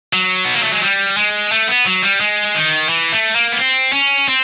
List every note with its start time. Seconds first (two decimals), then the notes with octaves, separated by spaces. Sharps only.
0.13 F#3
0.45 B3
0.54 A#3
0.63 A3
0.73 G#3
0.83 G3
1.17 G#3
1.52 A3
1.68 B3
1.86 F#3
2.03 G3
2.21 G#3
2.55 D#3
2.89 E3
3.12 A3
3.35 A#3
3.52 B3
3.59 C4
3.93 C#4
4.28 C4